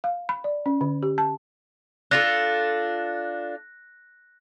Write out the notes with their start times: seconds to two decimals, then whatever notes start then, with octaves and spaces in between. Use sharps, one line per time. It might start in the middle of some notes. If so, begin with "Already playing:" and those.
0.04 F5
0.29 B5
0.44 D5
0.66 C#4
0.81 D3
1.03 G4
1.18 A5
2.11 D4 F4 A4 F#6 A#6